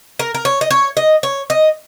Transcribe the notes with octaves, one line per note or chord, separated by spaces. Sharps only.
A#4
A#4
C#5
D#5
C#5
D#5
C#5
D#5